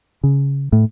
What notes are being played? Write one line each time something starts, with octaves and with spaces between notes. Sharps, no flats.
C#3
A2